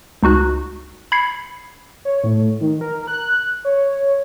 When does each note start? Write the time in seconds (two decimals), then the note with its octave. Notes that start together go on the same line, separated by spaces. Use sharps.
0.23 C#2 D#4 F#4 F#6
1.12 B5 G#6 C7 C#7
2.05 C#5
2.24 A2
2.61 D#3
2.81 A#4
3.08 F#6
3.65 C#5